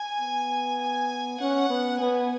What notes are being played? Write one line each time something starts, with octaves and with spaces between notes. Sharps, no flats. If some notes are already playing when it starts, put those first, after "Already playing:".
Already playing: G#5
B3
G#5
C#4 F#5
B3
B3 G#5